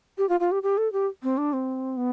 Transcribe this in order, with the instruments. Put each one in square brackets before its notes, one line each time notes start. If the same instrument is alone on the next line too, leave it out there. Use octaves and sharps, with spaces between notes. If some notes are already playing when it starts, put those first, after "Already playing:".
[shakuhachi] G4
F4
F4
G4
G4
A4
G4
C4
D4
C4
B3